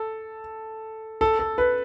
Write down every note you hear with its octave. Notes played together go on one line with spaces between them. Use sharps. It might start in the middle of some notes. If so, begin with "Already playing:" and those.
Already playing: A4
A4
A4
B4